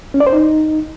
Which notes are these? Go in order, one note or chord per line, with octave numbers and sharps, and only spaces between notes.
C#4
D5
C5
D#4